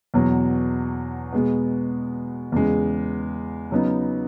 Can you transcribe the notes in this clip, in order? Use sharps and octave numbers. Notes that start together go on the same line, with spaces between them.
E2 B2 F#3
B2 G#3 B3
E2 C#3 G#3
C#3 F#3 B3 D#4